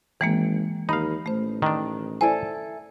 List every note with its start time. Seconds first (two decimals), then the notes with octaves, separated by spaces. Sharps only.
0.21 G#1 E3 G#3 A#3 G5
0.89 D#2 D#4 F5 B5
1.26 A1 A3 C5
1.62 D#3 D4
2.21 E4 A4 C5 D5 G#5